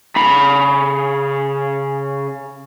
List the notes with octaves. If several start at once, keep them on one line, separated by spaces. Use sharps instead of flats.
C#3 B5